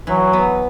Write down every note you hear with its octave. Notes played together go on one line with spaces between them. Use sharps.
E3 F#3
B3